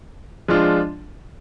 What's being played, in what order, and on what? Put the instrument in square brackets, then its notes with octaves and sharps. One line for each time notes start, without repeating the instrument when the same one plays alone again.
[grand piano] F3 G#3 D4 F4